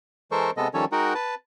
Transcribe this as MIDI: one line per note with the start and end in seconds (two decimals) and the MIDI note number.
0.31 0.51 52
0.31 0.51 56
0.31 0.51 69
0.31 0.51 70
0.31 0.51 72
0.31 0.51 85
0.57 0.68 48
0.57 0.68 56
0.57 0.68 59
0.57 0.68 69
0.57 0.68 75
0.74 0.85 51
0.74 0.85 53
0.74 0.85 55
0.74 0.85 61
0.74 0.85 69
0.74 0.85 73
0.92 1.13 56
0.92 1.13 63
0.92 1.13 66
0.92 1.13 70
0.92 1.13 78
0.92 1.13 79
1.15 1.35 71
1.15 1.35 81